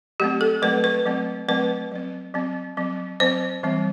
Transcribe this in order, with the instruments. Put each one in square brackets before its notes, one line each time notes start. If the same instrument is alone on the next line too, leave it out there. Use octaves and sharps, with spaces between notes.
[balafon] F#3 A3 C4 G4
A4
F#3 A3 C4 B4
B4
F#3 A3 C4
F#3 A3 C4 B4
F#3 C4
F#3 C4
F#3 C4
F#3 C4 C5
E3 G3 C4